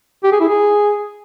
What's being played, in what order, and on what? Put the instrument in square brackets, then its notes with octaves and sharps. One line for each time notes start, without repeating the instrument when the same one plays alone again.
[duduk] G4
G#4
E4
G#4